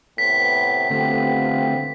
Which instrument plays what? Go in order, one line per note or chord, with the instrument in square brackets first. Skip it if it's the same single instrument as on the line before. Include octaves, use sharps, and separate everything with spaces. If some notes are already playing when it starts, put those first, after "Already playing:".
[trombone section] A2 C3 B3 [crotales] B6
[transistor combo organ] D3 A3 C4 [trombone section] B3 F4 G4